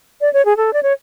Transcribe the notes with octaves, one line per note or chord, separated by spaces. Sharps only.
D5
C#5
G#4
A4
D5
C#5